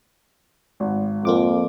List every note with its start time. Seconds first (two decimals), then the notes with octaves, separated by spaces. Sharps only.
0.80 G#1
1.25 F2 A#3 F4 D6